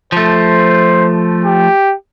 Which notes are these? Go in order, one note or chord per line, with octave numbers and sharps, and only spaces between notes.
F3 A3 C5
G4